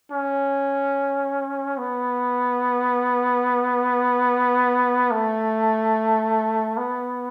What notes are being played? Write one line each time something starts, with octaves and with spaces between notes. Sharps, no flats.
C#4
B3
A3
B3